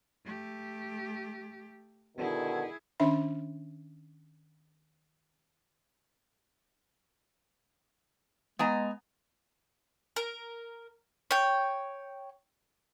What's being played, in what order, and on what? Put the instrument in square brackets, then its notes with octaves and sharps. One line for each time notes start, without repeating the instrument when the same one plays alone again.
[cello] A3 G4
[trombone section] B2 D3 D#3 [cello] E4 G#4
[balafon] D#3 C#4 D4 E5 B5
[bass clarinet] G#3 [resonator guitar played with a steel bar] B3 G#5 A#5
[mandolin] A#4
C#5 G5